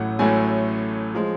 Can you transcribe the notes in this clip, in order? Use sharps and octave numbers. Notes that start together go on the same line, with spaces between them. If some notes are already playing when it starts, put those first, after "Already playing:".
Already playing: A1 A2 F#3 A3 F#5
A1 A2 F#3 A3 G#5
F3 G#3